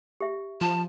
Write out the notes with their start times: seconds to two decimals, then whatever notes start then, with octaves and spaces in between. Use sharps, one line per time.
0.21 G4 E5
0.61 F3 A5